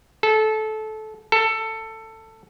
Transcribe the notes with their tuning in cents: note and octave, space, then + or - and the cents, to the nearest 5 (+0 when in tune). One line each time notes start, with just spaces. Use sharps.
A4 -20
A4 +15